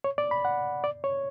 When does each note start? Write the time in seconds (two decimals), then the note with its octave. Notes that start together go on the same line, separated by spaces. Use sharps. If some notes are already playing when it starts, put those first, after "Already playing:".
0.04 C#5
0.18 D5
0.31 B5
0.45 F#5
0.84 D5
1.04 C#5